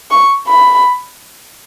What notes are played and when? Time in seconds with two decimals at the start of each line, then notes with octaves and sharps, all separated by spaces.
0.11 C#6
0.47 B5